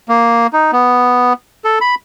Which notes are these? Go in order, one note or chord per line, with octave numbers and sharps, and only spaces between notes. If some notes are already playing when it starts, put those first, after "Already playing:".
A#3
D#4
B3
A4
B5